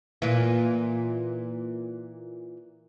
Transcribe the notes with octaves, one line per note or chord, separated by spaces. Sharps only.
A#2 E3